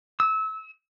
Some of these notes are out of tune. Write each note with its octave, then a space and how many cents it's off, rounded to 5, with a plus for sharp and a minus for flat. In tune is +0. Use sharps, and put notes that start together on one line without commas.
E6 -25